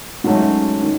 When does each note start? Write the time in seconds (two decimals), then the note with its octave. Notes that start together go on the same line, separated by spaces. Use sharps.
0.24 G#2 F#3 A3 C#4 F#4
0.83 D#3